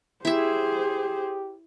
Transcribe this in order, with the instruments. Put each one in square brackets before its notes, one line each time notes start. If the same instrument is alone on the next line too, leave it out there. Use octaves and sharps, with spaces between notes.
[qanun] E4 E5 [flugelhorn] G4 [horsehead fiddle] G#4 C5